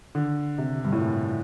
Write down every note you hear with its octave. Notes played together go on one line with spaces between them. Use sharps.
D3
C3
G2
A2
A#2